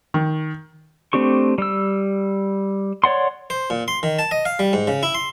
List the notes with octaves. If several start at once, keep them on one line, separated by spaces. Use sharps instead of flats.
D#3
A3 C4 D4 G4 C#6
G3 E6
C#5 D5 F#5 C6
C5
A#2
C6
D#3
A5
D#5
F5
G3
G#2
C#3
E4
C6